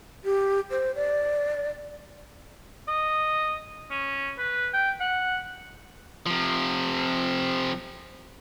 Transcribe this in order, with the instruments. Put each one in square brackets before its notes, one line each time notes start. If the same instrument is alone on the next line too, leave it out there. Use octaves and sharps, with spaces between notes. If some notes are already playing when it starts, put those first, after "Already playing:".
[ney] G4
C5
D5
[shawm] D#5
C#4
B4
G5
F#5
[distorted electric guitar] C3 F3